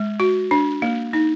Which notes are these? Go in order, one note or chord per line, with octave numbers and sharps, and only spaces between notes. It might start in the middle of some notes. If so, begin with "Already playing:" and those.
Already playing: G#3
F#4
D4
A#3
D#4